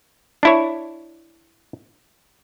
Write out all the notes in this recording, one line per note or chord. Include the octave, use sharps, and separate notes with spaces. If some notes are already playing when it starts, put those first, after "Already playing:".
D4 E4 C#5